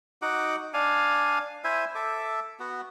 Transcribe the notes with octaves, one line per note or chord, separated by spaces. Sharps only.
D#4 F#4 F#5 D6
D4 F5 G#5
E4 C5 E5 G#5
A4 E5 D6
B3 F#4